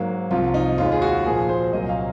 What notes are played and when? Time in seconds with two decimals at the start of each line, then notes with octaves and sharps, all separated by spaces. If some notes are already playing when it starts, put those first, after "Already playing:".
Already playing: G#2 F#3 A#3
0.31 C2 C3 F3 F4
0.54 D#4
0.78 D#2 D#3 G#3 F4
0.92 G#4
1.02 F#4
1.25 A#2 F3 A#3 G#4
1.49 C5
1.73 C2 A#2 F#3 A#3 D#5
1.89 F5